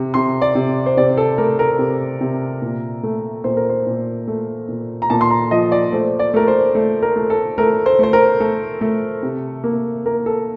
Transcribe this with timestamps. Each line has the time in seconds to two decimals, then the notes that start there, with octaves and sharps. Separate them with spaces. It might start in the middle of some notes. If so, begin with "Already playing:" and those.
Already playing: C3
0.14 C3 C6
0.42 D5
0.55 C3
0.86 C5
0.97 C3 D5
1.17 A4
1.38 A3 A#4
1.59 A#4
1.79 C3
2.21 C3
2.62 A#2
3.03 A3
3.44 A#2 C5
3.57 A#4
3.70 C5
3.87 A#2
4.28 A3
4.68 A#2
5.02 A#5
5.10 A#2 A5
5.21 C6
5.30 A#5
5.51 F3 D#5
5.72 D5
5.93 A3 C5
6.19 D5
6.34 A3 A#4
6.48 C5
6.75 A3
7.03 A#4
7.16 A3
7.30 A4
7.58 A3 A#4
7.86 C5
7.99 A3 C5
8.13 A#4
8.40 A3 A4
8.81 A3
9.23 C3
9.64 A#3
10.05 A#3 A#4
10.26 A4